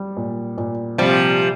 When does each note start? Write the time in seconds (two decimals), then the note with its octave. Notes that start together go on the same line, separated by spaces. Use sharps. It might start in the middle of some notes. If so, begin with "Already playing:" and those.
Already playing: G3
0.17 A#2
0.58 A#2
0.98 C3 F3 G3